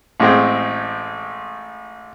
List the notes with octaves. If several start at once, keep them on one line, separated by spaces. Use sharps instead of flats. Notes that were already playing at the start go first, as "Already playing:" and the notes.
A1 A2 G#3 C4